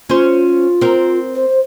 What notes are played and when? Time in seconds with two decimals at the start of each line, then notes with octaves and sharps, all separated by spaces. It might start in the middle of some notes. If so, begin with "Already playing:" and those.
0.09 C#4 F4 C5
0.81 C4 A#4
1.35 C5